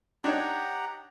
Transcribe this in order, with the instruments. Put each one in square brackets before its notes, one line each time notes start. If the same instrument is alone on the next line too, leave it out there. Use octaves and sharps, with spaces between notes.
[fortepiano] D4 D#4 C#5 [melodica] G4 F#5 A#5